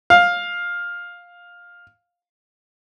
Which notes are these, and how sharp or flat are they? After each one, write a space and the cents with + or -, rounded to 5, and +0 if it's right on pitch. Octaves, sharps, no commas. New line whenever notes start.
F5 +10